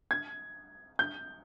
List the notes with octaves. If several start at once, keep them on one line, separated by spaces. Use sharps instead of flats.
G#6
G6